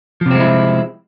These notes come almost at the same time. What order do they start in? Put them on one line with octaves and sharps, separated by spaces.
F3 C3 C4 G#3 E4